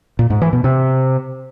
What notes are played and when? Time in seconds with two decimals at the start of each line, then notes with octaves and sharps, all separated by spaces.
0.19 A#2
0.30 G#2
0.42 E3
0.53 B2
0.64 C3